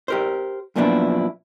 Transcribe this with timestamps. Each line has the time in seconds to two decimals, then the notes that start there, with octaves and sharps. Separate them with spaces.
0.08 G4 A#4 C5
0.76 F#2 A#2 F3 B3 D4 E4